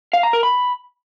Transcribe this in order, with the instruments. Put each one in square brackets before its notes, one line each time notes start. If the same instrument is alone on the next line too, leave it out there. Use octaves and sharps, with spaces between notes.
[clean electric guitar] F5
A#5
A#4
B5